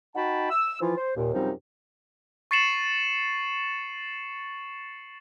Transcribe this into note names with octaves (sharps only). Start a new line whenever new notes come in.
D#4 F#4 F#5 G5 A5 B5
E6
E3 F3 F4
C5
D#2 A#2
F#2 C3 F3 G3 C4 D#4
C#6 A6 C7 C#7 E7 F#7